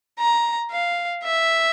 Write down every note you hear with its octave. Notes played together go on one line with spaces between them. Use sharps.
A#5
F5
E5